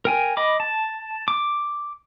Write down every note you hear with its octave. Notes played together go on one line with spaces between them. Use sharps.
A#4 G5 G#5
D#5 B5 D6
A5
D6